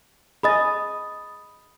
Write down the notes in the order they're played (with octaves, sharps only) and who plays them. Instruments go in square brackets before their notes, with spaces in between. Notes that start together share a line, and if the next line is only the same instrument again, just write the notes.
[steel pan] G#4 D#5 [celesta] B5 D#6 A6